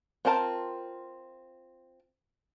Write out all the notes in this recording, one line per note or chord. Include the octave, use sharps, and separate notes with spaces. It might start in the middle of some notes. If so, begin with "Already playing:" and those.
C4 F4 A#4 A5